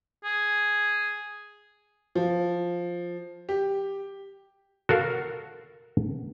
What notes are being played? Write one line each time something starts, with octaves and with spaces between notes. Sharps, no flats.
G#4
F3
G4
F#4 A4 A#4 F5